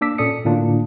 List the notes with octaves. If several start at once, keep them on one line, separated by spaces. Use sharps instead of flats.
A#3 D4 D6 E6 B6
A#2 C#4 A4 D5 D#6 C#7
A2 D3 A#3 D4 F4